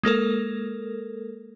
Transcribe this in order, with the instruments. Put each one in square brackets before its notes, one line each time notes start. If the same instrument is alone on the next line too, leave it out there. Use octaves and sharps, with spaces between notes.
[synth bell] G#3 A#3 A4 A#4